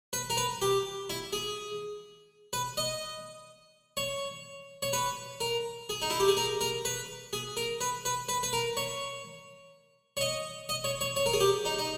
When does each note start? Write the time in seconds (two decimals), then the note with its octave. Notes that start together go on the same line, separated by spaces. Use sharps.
0.13 B4
0.30 A#4
0.37 B4
0.62 G4
1.10 E4
1.33 G#4
2.53 B4
2.77 D#5
3.97 C#5
4.82 C#5
4.93 B4
5.41 A#4
5.89 G#4
6.02 D#4
6.10 E4
6.20 G4
6.28 G#4
6.37 A#4
6.61 A#4
6.85 B4
7.33 G#4
7.57 A#4
7.81 B4
8.05 B4
8.29 B4
8.43 B4
8.53 A#4
8.77 C#5
10.17 C#5
10.21 D#5
10.69 D#5
10.84 C#5
11.01 C#5
11.16 C#5
11.26 A#4
11.33 G#4
11.40 G4
11.65 D#4
11.79 D#4